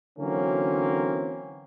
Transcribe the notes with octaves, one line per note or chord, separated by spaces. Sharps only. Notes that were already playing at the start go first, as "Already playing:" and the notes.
D3 E3 F#3 A#3 C4 C#4